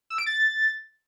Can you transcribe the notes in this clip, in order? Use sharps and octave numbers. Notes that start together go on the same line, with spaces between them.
E6
D7
A6